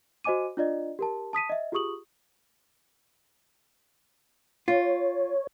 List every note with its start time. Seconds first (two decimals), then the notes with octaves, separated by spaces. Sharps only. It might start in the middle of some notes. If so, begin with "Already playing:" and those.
0.24 F#4 C5 D#5 G#5 D6 D#7
0.57 D4 F4 D5 D#5
0.99 G4 A#4 A5
1.33 A5 D#6 B6 D#7
1.50 D#5 E5
1.72 F4 G4 G#4 C#6 D#6 F#7
4.68 F4 C#5